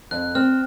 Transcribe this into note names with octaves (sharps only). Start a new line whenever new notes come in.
F2 F#6
C4 F6